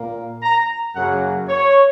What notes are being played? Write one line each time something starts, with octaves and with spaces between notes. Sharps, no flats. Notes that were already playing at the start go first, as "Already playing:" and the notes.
Already playing: A#2 A#3
A#5
F#2 C#3 F#3 A#3 F#5
C#5